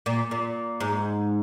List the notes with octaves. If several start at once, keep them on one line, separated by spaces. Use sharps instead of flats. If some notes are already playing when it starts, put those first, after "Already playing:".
A#2
A#2
G#2